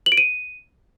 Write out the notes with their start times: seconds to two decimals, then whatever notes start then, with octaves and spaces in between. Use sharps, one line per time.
0.06 F#7
0.12 D7
0.17 D#7